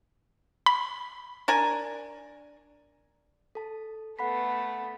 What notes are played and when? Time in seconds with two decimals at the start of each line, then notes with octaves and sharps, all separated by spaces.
0.66 B5
1.48 D4 A#4 G#5
3.55 A4 A5
4.19 A3 B3 F#5 B5 B6